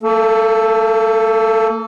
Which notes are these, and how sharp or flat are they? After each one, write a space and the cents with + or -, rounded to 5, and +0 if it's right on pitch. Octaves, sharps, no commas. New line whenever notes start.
A#3 -40 A4 +0